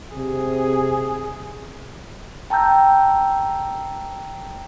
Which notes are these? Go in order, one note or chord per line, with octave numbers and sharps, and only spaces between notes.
C3 G#4
G5 A5 A#5 E6 G6